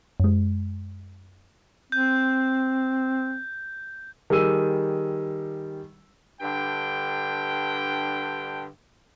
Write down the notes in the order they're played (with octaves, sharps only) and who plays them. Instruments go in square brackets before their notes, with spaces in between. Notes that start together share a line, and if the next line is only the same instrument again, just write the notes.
[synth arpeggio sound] F#2 G#3
[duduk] C4 [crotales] G6
[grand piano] D#3 G3 G4 G#4 E6 D#7
[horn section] G2 D3 G5